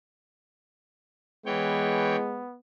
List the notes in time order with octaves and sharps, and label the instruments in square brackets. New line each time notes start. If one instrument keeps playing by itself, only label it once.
[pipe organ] E3 C#5 G5 [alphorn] G#3 [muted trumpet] B3